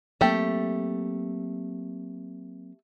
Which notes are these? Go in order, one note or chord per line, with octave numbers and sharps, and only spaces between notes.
F#3 A3 A#3 C4 G4